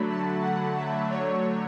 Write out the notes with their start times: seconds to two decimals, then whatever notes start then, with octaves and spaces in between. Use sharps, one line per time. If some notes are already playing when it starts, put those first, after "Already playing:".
Already playing: D3 F#3 A3 B5
0.09 A5
0.42 F#5
0.76 E5
1.09 D3 F#3 A3 C#5